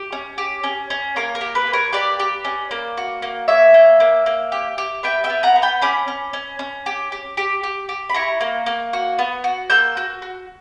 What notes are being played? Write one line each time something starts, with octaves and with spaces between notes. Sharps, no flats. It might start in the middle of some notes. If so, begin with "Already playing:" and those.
Already playing: G4
C#4
G4
C#4
C#4
A#3 A#4 C#5
A#4
G4
B4
A#3
A#4 C#5
G4 B4 D5
G4
C#4
A#3
F#4
A#3
A#3 C#5 E5
A#3
A#3
A#3
G4
G4
B3 E5 G5
E5 G5
B3
F#5 A#5
B3
G5 B5
C#4 B5 D6
C#4
C#4
C#4
G4
G4
G4
G4
G4
B5
E4 A#5 C#6
A#3
A#3
F#4
B3
F#4
A#3 E6 G6
F#4
F#4